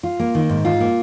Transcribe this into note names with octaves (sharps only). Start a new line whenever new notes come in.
F4
A#3
D#3
G#2
F4
A#3